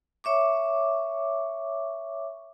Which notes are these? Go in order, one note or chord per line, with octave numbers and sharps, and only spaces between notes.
C#5 E5 C#6 D6